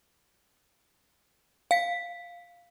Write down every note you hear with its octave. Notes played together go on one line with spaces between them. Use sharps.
F5 B6